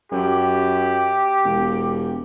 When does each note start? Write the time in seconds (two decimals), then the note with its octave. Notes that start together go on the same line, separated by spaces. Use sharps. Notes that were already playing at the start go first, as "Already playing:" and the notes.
0.12 F#2 G4
1.44 E1